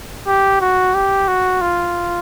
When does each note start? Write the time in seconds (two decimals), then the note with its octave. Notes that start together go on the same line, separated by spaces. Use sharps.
0.27 G4
0.61 F#4
0.95 G4
1.28 F#4
1.61 F4